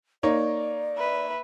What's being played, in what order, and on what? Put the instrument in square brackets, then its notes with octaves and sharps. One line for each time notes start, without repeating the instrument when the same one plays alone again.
[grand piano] A#3 D#4 C#5 [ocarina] D5
[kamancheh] B4 E5